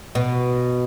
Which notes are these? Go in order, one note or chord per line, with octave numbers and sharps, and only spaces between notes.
B2